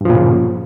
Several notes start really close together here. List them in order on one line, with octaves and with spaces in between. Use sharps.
G2 F3 A#2 C#3